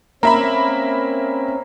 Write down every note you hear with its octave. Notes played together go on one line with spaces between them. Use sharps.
A#3 C4 C#4 E5 A#5 B5